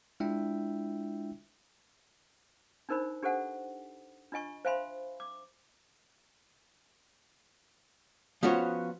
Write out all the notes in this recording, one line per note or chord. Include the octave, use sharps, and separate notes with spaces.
G#3 D4 E4 F4 E5 G5
D4 D#4 A#4 C5 B5
D4 G4 A4 C5 F#5 G#5
D4 F4 D#5 G#5 C#6
C5 E5 F5 G#5 B5 C6
D6
F3 B3 C#4 F#4 C5 C#5